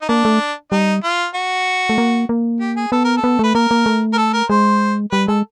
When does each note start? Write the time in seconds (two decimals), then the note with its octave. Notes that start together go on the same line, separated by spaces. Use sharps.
0.02 D#4
0.09 A#3 D4
0.25 A3
0.72 G3 D#4
1.04 F4
1.35 F#4
1.89 A3
1.98 A#3
2.29 A#3
2.60 G4
2.76 G#4
2.92 B3 A4
3.04 A#4
3.17 A4
3.24 B3
3.39 A3 B4
3.55 A#3 A#4
3.71 A#3
3.86 A3
4.13 A#4
4.18 A4
4.33 A#4
4.49 G#3 C5
5.12 G3 B4
5.28 G#3 A4